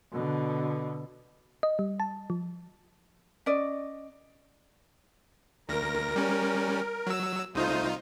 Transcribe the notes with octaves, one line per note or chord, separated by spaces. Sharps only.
B2 D3
D#5
G3
A5
F3
C#4 D5 D#5
D2 A#4 A#6
G3 C#4
F#3 E6
C2 A3 D#4 F4 C5 D#6